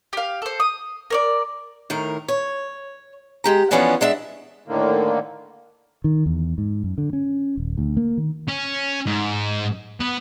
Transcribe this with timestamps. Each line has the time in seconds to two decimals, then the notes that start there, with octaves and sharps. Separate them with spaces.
0.13 G4 F5
0.42 A4 C5
0.60 D#6
1.10 A#4 C#5 D5
1.90 A2 D#3 A#4
2.28 C#5
3.44 G#3 G4 A#5
3.71 E3 F3 B3 C#4 D4 F#4
4.01 G#3 D4 E5 F#5
4.68 A2 D3 D#3 A#3
6.04 D#3
6.26 E2
6.58 G#2
6.84 F#2
6.98 D3
7.13 C#4
7.57 D#1
7.78 D2
7.97 A#3
8.17 D#3
8.48 C#4
9.06 G#2
10.00 B3